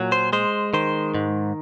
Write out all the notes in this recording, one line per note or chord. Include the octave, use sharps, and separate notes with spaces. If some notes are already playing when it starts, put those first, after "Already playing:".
Already playing: A#2 F#3
C5
G#3 C5
D#3 C5
G#2